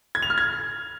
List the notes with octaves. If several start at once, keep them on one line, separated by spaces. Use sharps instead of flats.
G#6
F7
F6
G#6